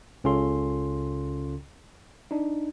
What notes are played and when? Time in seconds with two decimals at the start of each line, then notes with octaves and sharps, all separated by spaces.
0.24 C#2 C#3 C#4 F4 A4 C6
2.31 D4 D#4